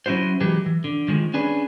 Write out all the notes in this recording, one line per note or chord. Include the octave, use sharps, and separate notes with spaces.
F#3 C#4 E4 F#4 C5
E3 F#3 G#3 G4 B4
E3
D3
D#3 F3 G#3
C#4 D4 G#4 B4